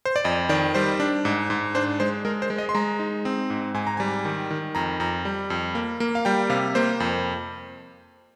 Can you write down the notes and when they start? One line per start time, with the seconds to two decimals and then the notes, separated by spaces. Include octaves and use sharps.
0.05 C5
0.16 D5
0.24 F2 D#5
0.49 D#3 D5
0.75 G3 C5
1.00 D4
1.25 G#2
1.50 G#2
1.75 D4 C5
2.00 G#3 C5
2.25 G#3 A#4
2.42 C5
2.50 G#3
2.58 D#5
2.69 C6
2.75 G#3 A#5
2.99 D#4
3.25 C4
3.50 G#2
3.74 G#2 G#5
3.87 A#5
3.97 G3 G#5
4.25 D#3
4.51 D#3
4.75 F2 A#5
5.00 F2 A#5
5.25 G3
5.50 F2
5.75 A#3
6.00 A#3
6.15 F5
6.25 G3 G5
6.50 C3 F5
6.75 A#3 C5
7.00 F2